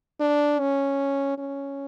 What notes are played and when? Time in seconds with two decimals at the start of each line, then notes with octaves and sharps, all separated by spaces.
0.20 D4
0.60 C#4
1.38 C#4